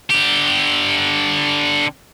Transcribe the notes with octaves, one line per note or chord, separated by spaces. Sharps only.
D3 G4